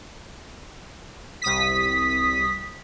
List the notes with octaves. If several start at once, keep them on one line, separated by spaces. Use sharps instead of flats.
C2 D#6 B6